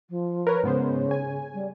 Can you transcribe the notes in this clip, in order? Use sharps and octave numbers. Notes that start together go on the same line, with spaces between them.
F3
A#4 B4 C#5
G#2 C#3 B3 C5
G#5
G3